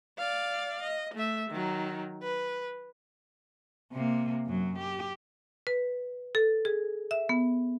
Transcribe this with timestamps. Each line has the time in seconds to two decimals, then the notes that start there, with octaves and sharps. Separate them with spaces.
0.18 D5 F5
0.82 D#5
1.14 A3 E5
1.50 D#3 F#3
2.22 B4
3.93 C3 A#3
4.46 F#2 F#3
4.79 G4
5.67 B4
6.35 A4
6.65 G#4
7.11 E5
7.29 B3